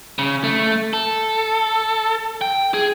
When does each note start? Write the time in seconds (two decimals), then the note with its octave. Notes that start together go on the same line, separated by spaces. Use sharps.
0.19 C#3
0.44 A3
0.93 A4
2.41 G5
2.74 G#4